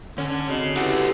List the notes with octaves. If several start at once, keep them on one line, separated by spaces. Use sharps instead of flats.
D3 C#4
C#3 C4 F#4 D#5
E4 F#4 G4 A4 B4 F#5